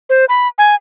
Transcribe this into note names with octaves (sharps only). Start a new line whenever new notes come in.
C5
B5
G#5